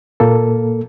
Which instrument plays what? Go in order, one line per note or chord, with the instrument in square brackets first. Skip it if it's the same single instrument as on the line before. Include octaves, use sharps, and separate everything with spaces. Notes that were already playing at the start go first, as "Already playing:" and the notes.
[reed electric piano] A#2 A#3 A4